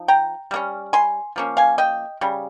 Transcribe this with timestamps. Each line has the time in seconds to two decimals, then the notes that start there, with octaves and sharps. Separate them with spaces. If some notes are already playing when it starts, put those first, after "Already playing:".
Already playing: F3 D#4
0.08 G5 A#5
0.51 G3 A#3 C#4
0.93 G#5 C6
1.36 F3 A#3 C#4
1.57 F5 G#5
1.78 D#5 G5
2.21 C#3 G3